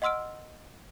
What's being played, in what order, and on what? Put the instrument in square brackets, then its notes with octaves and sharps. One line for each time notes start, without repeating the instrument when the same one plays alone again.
[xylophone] D#5 F#5 C6 E6 F6 D7